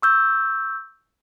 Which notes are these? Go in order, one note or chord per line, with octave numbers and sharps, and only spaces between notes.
C#6 E6 G6